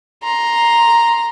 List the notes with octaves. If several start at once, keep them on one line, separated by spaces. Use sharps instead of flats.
A#5 C6